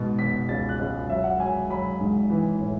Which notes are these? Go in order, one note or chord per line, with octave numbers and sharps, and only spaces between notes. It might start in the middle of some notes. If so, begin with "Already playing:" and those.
Already playing: G#2 B2
B2 B6
C#2 A6
F#6
C#2
F#3 E5
F#5
F#3 G#5
F#3 B5
G#2
E3
A2